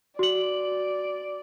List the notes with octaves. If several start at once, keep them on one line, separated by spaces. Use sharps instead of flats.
F#4 D5 F#7